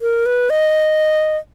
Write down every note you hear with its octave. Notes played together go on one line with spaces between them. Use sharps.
A#4
B4
D#5